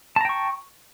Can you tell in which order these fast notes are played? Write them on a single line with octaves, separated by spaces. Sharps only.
A5 A#5 G5 C#6